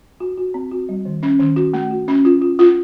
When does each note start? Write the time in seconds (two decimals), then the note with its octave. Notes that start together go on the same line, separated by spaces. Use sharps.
0.20 F#4
0.37 F#4
0.54 C4
0.71 F#4
0.89 G3
1.05 D#3
1.23 C#4
1.39 D#3
1.56 F#4
1.74 A3
1.91 F#4
2.08 C#4
2.25 F4
2.42 F4
2.59 F4